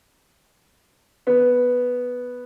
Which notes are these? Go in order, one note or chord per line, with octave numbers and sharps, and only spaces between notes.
B3